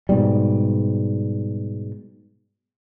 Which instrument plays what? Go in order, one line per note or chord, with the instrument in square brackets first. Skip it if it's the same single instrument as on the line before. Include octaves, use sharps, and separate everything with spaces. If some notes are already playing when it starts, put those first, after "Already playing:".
[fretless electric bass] G#2 B2 G3